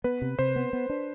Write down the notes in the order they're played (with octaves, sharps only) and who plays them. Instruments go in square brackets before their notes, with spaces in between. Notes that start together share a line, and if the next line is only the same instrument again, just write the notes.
[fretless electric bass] B3 [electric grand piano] B4
[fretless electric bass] C3
[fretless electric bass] C3 [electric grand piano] C5
[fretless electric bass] B3
B3
D4